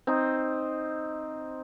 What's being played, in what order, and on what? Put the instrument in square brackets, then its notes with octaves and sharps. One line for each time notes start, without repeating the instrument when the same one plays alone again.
[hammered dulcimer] C4 D#4